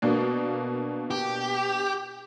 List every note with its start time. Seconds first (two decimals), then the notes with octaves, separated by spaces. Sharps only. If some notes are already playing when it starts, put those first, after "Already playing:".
0.02 B2 A#3 D4
1.10 G4